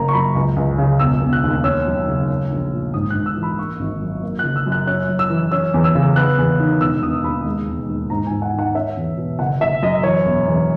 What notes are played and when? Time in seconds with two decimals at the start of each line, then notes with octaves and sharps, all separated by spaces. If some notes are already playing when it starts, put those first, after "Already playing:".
Already playing: F#1 A#3 A#5
0.08 C#6
0.13 F#2 B5
0.35 C#2
0.56 C#2
0.78 C#3
0.99 E1 E6
1.21 E1
1.33 F#6
1.44 D#2
1.64 C#4 E6
1.86 F#2
2.08 C#3
2.29 C#4
2.50 A#1
2.72 A#2
2.94 G#2 D#6
3.10 F#6
3.15 G#2
3.26 E6
3.37 E3
3.43 B5
3.59 A#3 C#6
3.80 G#1
4.02 F#2
4.23 A#3
4.39 F#6
4.44 F#1
4.56 E6
4.67 F#2
4.72 F#6
4.87 C#4 F#6
5.09 F#2
5.19 E6
5.30 E3
5.52 C#4 E6
5.74 E2
5.84 E6
5.95 C#3
6.16 B3 F#6
6.38 E2
6.60 D#3
6.81 E1 E6
7.02 E1 D#6
7.24 D#2 B5
7.46 G#3
7.67 E1
7.89 D#2
8.10 G#2 A#5
8.27 G#5
8.31 G#2
8.42 F#5
8.53 D#3
8.59 F#5
8.75 C#4 E5
8.97 E2
9.17 B2
9.39 F#1 F#5
9.60 F#1 E5
9.83 F#2 D#5
10.03 E3 C#5
10.25 E1
10.48 E2